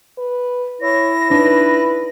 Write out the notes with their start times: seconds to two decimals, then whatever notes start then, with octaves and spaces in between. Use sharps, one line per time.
0.18 B4
0.82 E4 C#5 A#6
1.30 D4 D#4 B4